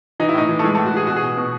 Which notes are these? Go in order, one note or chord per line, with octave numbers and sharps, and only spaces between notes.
E3 D#4
E4
A2 D#4
E3
A3
E3 G#3
A3
A2
F#4
E3 G#4
B2 F#4
G#4
B2
B2